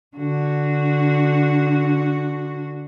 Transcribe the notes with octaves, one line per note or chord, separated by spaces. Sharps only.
D3 F#4